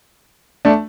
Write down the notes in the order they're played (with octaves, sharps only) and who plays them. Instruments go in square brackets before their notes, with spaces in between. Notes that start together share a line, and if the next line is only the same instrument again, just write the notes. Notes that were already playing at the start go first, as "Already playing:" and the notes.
[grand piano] A3 D4